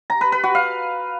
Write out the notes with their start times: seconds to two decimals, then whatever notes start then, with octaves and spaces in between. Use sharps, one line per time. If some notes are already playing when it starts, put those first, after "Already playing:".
0.10 A#5
0.21 B4
0.32 B4
0.44 F#4
0.55 F5